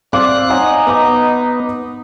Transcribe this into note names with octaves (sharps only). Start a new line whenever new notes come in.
C4 D5 F5 C6 D6 F#6
D#4 C#5 F#5 G#5
B3 D#5 A#5 D6